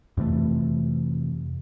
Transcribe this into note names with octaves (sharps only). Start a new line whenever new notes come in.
F2 C3 E3 A3